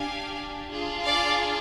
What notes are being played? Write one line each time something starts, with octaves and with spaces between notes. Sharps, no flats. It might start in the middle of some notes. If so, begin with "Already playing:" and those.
Already playing: D4 G4 F5 G#5
D4 F4 G#4
D5 F5